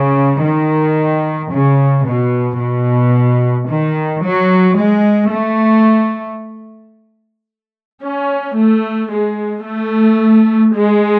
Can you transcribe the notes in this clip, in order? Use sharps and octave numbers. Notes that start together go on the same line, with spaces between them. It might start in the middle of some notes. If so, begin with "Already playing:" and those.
Already playing: C#3
D#3
C#3
B2
B2
D#3
F#3
G#3
A3
C#4
A3
G#3
A3
G#3